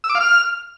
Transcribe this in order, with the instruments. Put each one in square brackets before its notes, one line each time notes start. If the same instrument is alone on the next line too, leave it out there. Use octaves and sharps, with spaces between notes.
[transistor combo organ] E6
D6
F5
F6